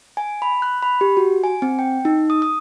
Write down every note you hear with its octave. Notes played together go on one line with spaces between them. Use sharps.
G#5
B5
F#6
B5
G4
F#4
G#5
C4
G5
D#4
D#6
D#6